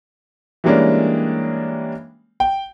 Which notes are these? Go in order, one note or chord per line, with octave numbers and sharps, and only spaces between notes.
E3 G3 G#3 A#3 C#4 D4
G5